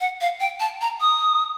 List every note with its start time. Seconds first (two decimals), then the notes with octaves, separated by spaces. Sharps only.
0.01 F#5
0.21 F5
0.40 G5
0.60 A5
0.81 A#5
1.01 D#6